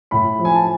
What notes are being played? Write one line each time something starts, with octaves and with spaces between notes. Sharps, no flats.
A2 B5
F3
G#5
A5